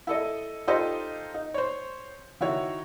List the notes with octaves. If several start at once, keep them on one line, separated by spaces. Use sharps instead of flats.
E4 A4 D#5
D#4 F4 G4 A4 C5 D#5
D#4
C5 C#5
D#3 E4 F#4 C#5